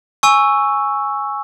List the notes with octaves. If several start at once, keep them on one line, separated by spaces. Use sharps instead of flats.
G#5 C#6 E6